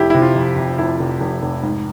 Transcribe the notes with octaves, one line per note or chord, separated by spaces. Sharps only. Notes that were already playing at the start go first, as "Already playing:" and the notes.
Already playing: F1 E4 G4
C3 E4
F4
F2
C3
F1 E4
F1
F1
F1
G#2